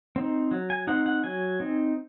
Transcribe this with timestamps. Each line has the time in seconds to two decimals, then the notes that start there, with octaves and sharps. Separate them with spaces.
0.16 C4 D#4
0.51 F#3
0.70 G#5
0.87 C4 D#4 F#5
1.06 F#5
1.24 F#3 G#5
1.60 C4 D#4